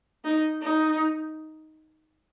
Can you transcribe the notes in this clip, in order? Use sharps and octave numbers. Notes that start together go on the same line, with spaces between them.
D#4
D#4